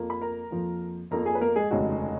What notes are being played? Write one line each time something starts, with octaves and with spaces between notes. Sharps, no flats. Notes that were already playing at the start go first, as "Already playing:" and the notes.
Already playing: F2 F3 A#3
B5
A#4 A#5
F2 F3 A#3
F2 F3 A#3 A#4 A#5
G#4 G#5
B4
A#3 A#4
G#3 G#4
F1 D#2 C#3 G#3 F#4